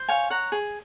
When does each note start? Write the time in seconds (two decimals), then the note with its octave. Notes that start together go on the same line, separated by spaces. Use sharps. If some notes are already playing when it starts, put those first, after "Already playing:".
Already playing: C5
0.09 C#5 F5 G#5
0.30 C#5 F#5 A#5
0.52 G#4